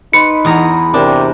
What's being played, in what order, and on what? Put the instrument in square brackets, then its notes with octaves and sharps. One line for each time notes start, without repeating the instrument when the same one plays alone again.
[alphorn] D#4 [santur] B4 B5 C6 [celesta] C#7
[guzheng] E2 G#4 A#5
[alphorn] C3 [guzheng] D4 [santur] A#4 G5 G#5